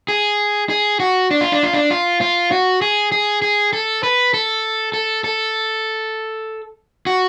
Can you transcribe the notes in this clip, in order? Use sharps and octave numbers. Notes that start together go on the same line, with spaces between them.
G#4
G#4
F#4
D4
F4
D4
F4
D4
F4
F4
F#4
G#4
G#4
G#4
A4
B4
A4
A4
A4
F#4